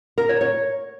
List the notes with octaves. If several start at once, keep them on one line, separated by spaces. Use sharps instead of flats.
A#4
C#5
C#5